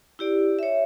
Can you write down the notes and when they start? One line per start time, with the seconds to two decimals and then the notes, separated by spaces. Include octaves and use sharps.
0.19 E4 G4 D5
0.59 C#5 E5